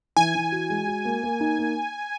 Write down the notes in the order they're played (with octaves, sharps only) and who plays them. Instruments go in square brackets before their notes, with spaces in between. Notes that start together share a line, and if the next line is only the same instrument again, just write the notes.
[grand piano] E3 [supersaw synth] G#5
[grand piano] E3
F#4
G#3
F#4
A#3
A#3
D#4
A#3